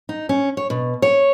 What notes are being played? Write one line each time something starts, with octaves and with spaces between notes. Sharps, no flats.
D#4
C#4
C#5
B2
C#5